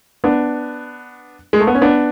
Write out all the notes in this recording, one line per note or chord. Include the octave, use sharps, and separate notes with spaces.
B3 D4
G#3
A3
B3
C#4
B3 D4